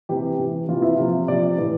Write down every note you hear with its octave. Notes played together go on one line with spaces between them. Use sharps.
C3 E3 G4
C3 E3
C3 E3 F4
E4
C3 F3 F4
C3 F3 D5
A2 E3